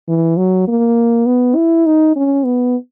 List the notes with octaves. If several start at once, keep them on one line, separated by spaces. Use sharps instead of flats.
E3
F#3
A#3
B3
E4
D#4
C#4
B3